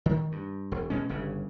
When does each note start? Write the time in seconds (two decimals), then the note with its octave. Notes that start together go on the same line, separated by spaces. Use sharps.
0.06 D#3
0.32 G2
0.72 E1
0.90 B2 G#3 C#4
1.09 G1 G2 C#3